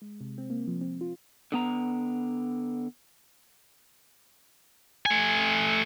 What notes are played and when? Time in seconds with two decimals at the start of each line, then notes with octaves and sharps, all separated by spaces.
0.02 G#3
0.21 C3
0.38 C4
0.50 A#3
0.68 F3
0.81 C4
1.01 F4
1.52 D3 B3 A#5
5.06 A3 G#5